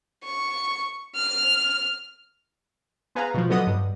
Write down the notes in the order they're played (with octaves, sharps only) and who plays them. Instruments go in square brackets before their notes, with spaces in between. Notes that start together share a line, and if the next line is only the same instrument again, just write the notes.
[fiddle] C#6
F6
[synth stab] B3 G#4 B4 F5 A#5
B2 F3
D3 F#3 B3 D#5 F#5 D#6
G2